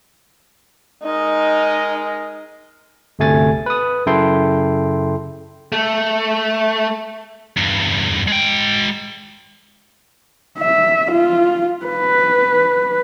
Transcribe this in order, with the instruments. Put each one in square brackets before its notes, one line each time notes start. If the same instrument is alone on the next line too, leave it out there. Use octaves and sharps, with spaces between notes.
[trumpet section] G#3 A#4 D#5 [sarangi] D#4
[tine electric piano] G1 D2 C3 A3 G#5 A6
B4 D#6
F#2 C#3 E4 A4 G5 C6
[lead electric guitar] A3
[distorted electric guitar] E2 G2
G#3 G5
[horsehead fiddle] E5
F4
B4